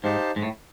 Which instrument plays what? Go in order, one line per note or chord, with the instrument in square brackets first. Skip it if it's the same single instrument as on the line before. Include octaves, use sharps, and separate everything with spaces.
[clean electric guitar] G#2 [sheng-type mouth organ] D#4 G4 C5 F5 A5
[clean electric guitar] G#2
A2